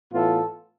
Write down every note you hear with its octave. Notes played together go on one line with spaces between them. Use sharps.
A2 E3 B3 F4 A4